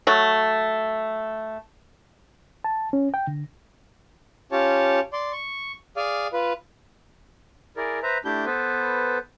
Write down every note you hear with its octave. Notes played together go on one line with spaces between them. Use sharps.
F#3 A3
A5
C#4
G5
D3
C#4 F4 G4 C#5 A5
D5 C6
C#6
G#4 D5 F5 G#5
F4 B4
E4 G#4 A#4 D5
B4 C5 E5 A#5
A3 D4 E4 G4 G6
B3 A4 B4 C5